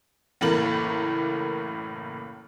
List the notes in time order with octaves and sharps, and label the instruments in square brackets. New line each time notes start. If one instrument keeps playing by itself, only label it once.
[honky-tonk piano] F#1 A2 E3 A3 A#3 F#7